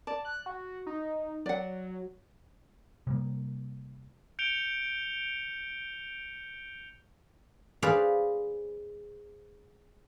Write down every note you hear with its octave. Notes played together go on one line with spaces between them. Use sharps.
D5 A5
F#6
F#4
D#4
F#3 D5 F#5
C3 G3 A#3
G6 C#7 D7 F7 G7
G#4 B4 C5 D5 F5